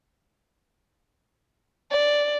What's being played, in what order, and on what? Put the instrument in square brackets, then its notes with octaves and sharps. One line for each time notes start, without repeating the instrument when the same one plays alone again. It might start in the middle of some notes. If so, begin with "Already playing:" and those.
[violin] D5